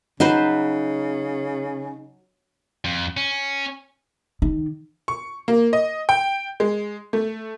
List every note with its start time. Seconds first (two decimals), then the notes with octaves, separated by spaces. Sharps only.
0.20 C#3 F#3 D#4 B4 C5
2.85 F2
3.17 C#4
4.42 D#3
5.08 C#6
5.48 A#3
5.73 D#5
6.09 G5
6.60 G#3
7.13 A3